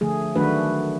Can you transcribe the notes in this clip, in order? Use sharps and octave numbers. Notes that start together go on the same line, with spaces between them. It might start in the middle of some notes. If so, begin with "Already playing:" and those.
D3 F3 A3 G#4
D#3 F#3 A3 D4 F#4 B4